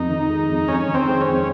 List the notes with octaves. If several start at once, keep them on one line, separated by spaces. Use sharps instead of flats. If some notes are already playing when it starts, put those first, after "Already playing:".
Already playing: F2 D#4
D#3
G#3
F2
F2 C#4
D#3
C4
G#3
C#4
F2